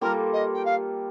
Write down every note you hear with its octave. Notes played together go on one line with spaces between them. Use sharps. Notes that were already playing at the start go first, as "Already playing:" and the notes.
G3 A#3 F4 A4 A#4
D#5
G5
F5